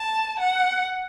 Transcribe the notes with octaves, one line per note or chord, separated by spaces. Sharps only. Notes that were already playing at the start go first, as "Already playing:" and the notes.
Already playing: A5
F#5